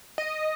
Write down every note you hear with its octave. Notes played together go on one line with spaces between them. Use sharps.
D#5